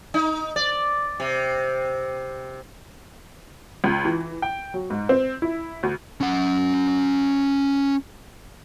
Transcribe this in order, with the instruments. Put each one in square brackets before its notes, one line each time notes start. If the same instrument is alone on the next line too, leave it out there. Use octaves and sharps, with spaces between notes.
[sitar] D#4
D5
C3
[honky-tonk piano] C#2
E3
G5
F#3
G#2
C4
E4
D2
[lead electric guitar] C#4 F#5